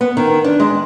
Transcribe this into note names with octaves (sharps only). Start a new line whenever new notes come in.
B3
D#3
D4
G#3